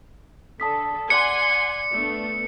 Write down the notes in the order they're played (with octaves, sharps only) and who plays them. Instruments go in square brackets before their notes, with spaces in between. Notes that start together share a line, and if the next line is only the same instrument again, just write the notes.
[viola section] D3 A4 [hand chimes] A5 D#6 B6
[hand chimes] D5 D6 F#6 [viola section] F#5 G#5 C6 [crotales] C#7
[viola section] A3 B3 D4